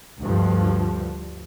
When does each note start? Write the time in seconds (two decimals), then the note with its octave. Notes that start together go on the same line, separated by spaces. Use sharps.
0.23 D2 G2 F3